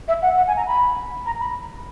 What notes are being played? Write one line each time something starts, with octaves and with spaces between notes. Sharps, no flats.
E5
F#5
F#5
G#5
A#5
B5
A#5
B5